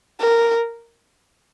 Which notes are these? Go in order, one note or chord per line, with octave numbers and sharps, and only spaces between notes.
A#4